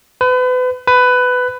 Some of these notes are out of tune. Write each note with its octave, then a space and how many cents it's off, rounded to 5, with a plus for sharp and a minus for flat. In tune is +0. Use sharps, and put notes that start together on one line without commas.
B4 +35
B4 +15